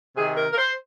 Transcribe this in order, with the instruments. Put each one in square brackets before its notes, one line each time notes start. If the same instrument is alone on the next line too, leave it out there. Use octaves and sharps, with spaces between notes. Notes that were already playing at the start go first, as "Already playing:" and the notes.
[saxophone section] C3 D#3 G#4
A#4
A#4
C5